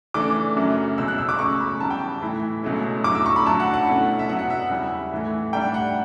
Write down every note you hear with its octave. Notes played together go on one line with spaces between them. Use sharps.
C#3 E3 A3 D4 D6
F#2 C#3 F#3 A3
C#2 B2 F#3 E6
F#6
E6
D6
C#2 C#3 F#3 A3 C#6
B5
C#3 E3 G3 B3 A5
G5
A2 E3 A3 E4
C#2 B2 F#3 A3 C#4
G2 F#3 A3 E4 D6
E6
C#6
B5
D2 D3 F#3 A5
F#5
F#5
B2 A3 C#4 E4
E5
B2 F#3 B3 D4 F#5
F#5
E5
F#5
E2 C#3 G3 C#4 E4
A2 E3 A3
A2 G3 D4 G5
F#5